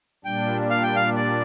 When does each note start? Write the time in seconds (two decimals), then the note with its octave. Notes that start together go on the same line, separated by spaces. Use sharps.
0.25 A#2 G3 D4 G5
0.70 F5
0.83 G5
0.96 F5
1.16 D5